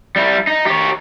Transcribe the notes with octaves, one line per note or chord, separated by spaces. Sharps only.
G3 E4
D#4
G4 C#5